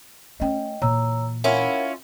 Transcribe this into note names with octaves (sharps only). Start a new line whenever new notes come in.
A3 C#4 D#5 G5
A#2 E3 C#5 A#5 E6
C#4 E4 F4 A#4 C#5 F#5